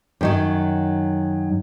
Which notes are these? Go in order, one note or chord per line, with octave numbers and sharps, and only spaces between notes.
F#2 D#3 F#3